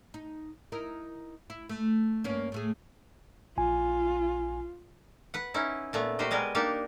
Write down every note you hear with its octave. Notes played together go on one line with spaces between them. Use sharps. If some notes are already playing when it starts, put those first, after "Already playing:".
D#4
D#4 E4 A#4
E4
A3
G2 A#3 C#4
A2 A3 G#4
A#1 F4 G#5
B4 F#5
C#4 D#4 E4
A#2 A3 B3
F#4 G4 A#4 C5 D#5
G3 G#3 B3 A#4 G#5
A#3 D4 D#4 G4 A#4 A5